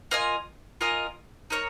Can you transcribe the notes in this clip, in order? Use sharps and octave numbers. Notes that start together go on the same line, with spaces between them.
F4 A#4 D#5 G#5
F4 A#4 D#5 G#5
D#4 A#4 C#5